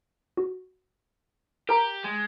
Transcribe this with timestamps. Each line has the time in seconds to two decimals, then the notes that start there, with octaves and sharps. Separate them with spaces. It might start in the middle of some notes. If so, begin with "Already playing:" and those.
0.37 F#4
1.69 G4 A#4 A#5
2.04 G#3